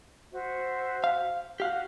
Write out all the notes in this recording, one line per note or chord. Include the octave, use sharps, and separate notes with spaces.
F#4 C5 E5
F5
F#4 G4 F5 F#5